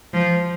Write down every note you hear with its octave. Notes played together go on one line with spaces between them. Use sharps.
F3